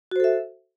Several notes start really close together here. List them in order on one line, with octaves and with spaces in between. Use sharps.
F#4 C5 A4 E5